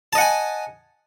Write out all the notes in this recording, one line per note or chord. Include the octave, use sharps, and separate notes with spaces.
D#5 F#5 G#5 A5